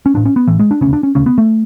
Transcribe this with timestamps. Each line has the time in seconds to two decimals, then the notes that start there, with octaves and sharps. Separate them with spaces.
0.06 C#4
0.14 A1 A2 D4
0.25 C#4
0.36 B3
0.47 A1 A2 E3
0.59 G#3
0.71 D4
0.81 E1 D2 C#3 C#4
0.93 D4
1.03 C#4
1.15 E1 D2 C#3 C#4
1.26 B3
1.38 A3